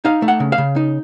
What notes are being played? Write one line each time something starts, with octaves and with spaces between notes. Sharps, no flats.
D#4 F5
A3
F#5
C#3
F5
C#3
D#4